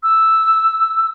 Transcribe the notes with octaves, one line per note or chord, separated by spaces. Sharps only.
E6